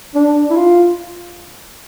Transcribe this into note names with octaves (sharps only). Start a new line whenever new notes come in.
D4
E4
F4